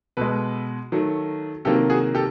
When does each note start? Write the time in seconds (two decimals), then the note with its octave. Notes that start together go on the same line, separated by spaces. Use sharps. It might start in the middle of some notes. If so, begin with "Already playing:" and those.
0.17 B2 G#3 A4 B4
0.92 D#3 F#3 A3
1.65 C3 D#3 F#3 A#3 G4 A4
1.90 F#4 G#4
2.15 G4 A4